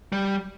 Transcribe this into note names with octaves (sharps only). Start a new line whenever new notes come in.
G3